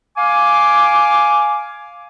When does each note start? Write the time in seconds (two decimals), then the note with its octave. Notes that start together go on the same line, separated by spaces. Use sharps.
0.17 F5 G#5 D6